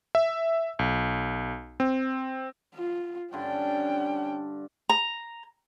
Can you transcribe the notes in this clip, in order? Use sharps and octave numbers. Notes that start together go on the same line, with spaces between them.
E5
B1
C4
F4
G2 D3 C#4 G5
A#5